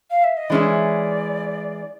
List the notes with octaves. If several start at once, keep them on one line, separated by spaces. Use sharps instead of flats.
F5
E5
D#5
E3 G#3 C#4 E4 D5